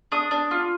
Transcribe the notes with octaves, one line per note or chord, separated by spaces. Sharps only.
D4 D#6
D4
F4